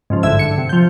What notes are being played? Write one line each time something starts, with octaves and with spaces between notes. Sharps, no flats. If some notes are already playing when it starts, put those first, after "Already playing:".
G#2 C#3 F3
A1 G2 D3 E5 E6 G#6
D3 C#7
C3
F3 G6